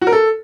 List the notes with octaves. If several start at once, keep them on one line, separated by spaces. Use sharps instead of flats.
F#4
A#4
A4